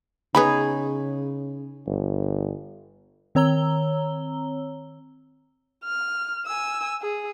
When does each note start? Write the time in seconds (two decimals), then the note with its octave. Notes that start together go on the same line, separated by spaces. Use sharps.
0.35 C#3 B3 D#4 G#4 C#5 B5
1.87 G1
3.35 D#3 C4 C#5 A#5 E6 G7
5.84 F6
6.47 G#5 E6
7.02 G#4